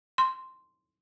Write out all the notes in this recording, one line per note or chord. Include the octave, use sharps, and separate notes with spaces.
C6